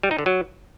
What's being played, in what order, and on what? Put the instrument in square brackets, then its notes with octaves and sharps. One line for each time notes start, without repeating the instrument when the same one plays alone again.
[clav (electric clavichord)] G3
D#4
D3
F#3